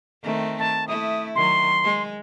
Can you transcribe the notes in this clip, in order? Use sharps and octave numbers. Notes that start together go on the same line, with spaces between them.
D#3 A3 C4
A5
A3 E4 D#6
D#3 F#3 C6
G#3